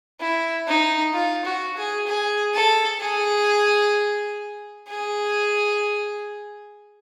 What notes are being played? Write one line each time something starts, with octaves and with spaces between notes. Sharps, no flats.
E4
D#4
F4
F#4
G#4
G#4
A4
G#4
G#4